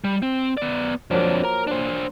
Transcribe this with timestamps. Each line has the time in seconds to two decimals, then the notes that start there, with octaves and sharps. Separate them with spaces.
0.04 G3
0.22 C4
0.57 B3 D5
1.11 F2 F3 F#3 A#3 D4
1.44 A#4 A#5
1.67 D4 C5